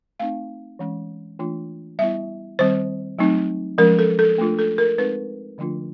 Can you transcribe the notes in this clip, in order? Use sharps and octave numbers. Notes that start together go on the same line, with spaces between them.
A3 C4 D#4 F5
E3 G#3 C#4
E3 A3 D4 F4
G3 B3 E4 E5
D#3 G3 C4 C5
F#3 A3 C4 D#4
F3 G#3 C#4 A#4
A4
A4
A3 D4 F4
A4
A#4
G#3 C4 D#4 B4
D3 F3 A3 D4 F4